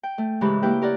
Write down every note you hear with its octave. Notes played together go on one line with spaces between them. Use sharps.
G5
A3
G#2 C#3 E3 G#3 G4 B5
A#3 E4 G4 B4 G5
G4 A#4 D5 F#5